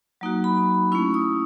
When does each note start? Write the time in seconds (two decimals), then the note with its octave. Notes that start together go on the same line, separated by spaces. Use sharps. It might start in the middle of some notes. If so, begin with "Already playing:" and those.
0.21 F#3 A#3 D#4 F#4
0.44 B5
0.92 A3 C#4 E4 C#6
1.14 D#6